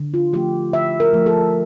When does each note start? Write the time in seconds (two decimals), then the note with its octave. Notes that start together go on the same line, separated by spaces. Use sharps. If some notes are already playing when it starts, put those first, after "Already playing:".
Already playing: D3
0.14 F4
0.33 F3 A3 G4
0.73 D3 E5
1.00 A#4
1.13 F3 A3
1.26 A4